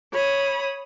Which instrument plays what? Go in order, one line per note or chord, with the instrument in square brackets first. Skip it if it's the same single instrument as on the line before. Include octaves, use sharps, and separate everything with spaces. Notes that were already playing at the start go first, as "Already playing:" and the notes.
[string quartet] C#5 B5 D#6